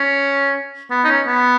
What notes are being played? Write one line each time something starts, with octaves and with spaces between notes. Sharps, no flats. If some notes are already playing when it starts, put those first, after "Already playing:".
Already playing: C#4
B3
D#4
C#4
B3